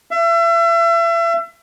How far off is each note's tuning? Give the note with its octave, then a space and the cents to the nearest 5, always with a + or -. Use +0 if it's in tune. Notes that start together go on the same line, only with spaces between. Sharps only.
E5 +35